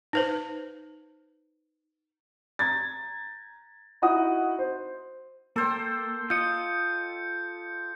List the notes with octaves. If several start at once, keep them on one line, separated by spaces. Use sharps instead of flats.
D#4 B4 C5
A#5 G#6 A6
D#4 E4 F#4 F#5 D#6
C5
A#3 A4 C5 G5
F4 D#5 G6 C#7